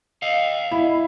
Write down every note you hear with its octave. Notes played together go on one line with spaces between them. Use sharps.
D#5 F5
E4